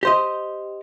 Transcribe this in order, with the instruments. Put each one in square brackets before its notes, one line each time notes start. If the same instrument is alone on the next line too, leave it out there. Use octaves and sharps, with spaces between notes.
[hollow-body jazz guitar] G4 C5 D#5